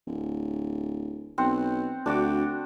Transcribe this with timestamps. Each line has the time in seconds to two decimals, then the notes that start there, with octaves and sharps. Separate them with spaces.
0.07 D1
1.38 B1 C4 C5 F#5
2.06 D2 D4 F#4 D6